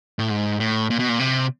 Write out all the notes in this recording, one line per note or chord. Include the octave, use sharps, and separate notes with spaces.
A2
G#2
A2
A#2
B2
A#2
C3